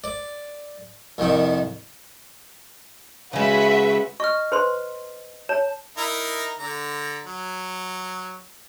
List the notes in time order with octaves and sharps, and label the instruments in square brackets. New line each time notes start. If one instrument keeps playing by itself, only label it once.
[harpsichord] D5
C2 F2 D#3
[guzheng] C#3 G#3 [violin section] F#4 B4 E5
[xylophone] D#5 F6 [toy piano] C#6
[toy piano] B4 C5 C6
[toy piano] C#5 [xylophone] A5
[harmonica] D#4 E4 A#4
D3 A#5
F#3